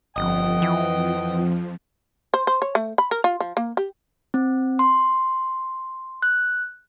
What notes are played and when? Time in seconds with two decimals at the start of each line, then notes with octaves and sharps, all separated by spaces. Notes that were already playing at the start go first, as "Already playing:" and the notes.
0.16 G1 F2 F3 D#5 F#5 G5
0.62 E3
2.34 C5
2.47 C5
2.62 C#5
2.75 A3
2.98 B5
3.11 A#4
3.24 F4
3.40 F3
3.57 A#3
3.77 G4
4.34 C4
4.79 C6
6.22 F#6